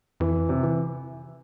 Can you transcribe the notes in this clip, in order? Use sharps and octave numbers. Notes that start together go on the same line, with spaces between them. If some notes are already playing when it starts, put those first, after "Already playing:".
F2 E3
C3
E3